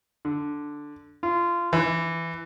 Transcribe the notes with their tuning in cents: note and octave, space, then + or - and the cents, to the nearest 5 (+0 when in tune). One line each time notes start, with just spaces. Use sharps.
D3 +0
F4 -20
E3 +10